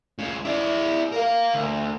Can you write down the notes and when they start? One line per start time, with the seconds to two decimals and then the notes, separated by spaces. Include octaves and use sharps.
0.18 C#2 C#3
0.45 E4 D5
1.12 A#4 F5
1.54 D2